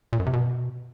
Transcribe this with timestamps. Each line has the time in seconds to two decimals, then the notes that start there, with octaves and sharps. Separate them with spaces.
0.13 A#2
0.20 F#2
0.26 C3
0.33 B2